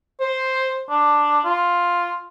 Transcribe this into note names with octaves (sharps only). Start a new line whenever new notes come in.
C5
D4
F4